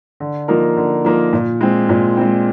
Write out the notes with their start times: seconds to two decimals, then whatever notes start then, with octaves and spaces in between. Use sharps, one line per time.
0.20 D3
0.48 F3 A#3 D#4 A#4
0.77 D3
1.05 F3 A#3 D#4 A#4
1.33 A#2
1.61 G#3 C4
1.89 A#2
2.17 G#3 C4